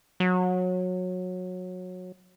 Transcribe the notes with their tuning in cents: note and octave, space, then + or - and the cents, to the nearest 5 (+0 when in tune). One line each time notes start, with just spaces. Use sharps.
F#3 -20